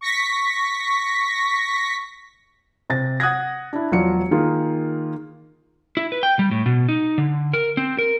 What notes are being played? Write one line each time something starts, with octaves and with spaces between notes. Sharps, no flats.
C#6 A#6 B6
C3 A6 A#6
F#5 D#6 F#6 G#6 A#6
D4 E4
E1 F3 F#3 F4 D5 C#7
D#3 A#3 F4 G#4
E4
B4
G5
G3
A2
B2
D#4
D3
A#4
C4
A#4